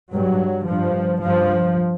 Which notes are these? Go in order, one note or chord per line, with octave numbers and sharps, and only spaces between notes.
G2 F#3
G2 F3
G2 F3